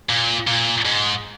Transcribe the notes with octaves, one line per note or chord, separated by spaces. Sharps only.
A#2
A#2
G#2